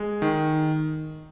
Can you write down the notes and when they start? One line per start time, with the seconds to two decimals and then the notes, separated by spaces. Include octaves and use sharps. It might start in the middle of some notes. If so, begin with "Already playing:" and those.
Already playing: G#3
0.22 D#3